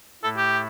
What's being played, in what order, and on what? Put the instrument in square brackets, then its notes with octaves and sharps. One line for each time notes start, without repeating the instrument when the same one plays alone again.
[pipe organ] A2 A3 E4 [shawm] A4
[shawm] G4